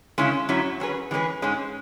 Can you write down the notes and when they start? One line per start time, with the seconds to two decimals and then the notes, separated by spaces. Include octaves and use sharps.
0.18 C#3 G#3 C#4 E4
0.49 F#2 F#3 C#4 E4
0.80 F#3 C#4 G#4 B4
1.11 E3 G#3 C#4 G#4 B4
1.42 G#2 G#3 C#4